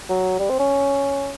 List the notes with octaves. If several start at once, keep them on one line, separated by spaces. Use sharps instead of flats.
F#3
G3
C4
C#4